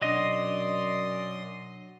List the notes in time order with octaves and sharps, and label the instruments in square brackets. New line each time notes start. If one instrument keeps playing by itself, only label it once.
[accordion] F#2 C6 D#6 [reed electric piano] B2 D4 [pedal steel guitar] F#3 D#5 [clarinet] D5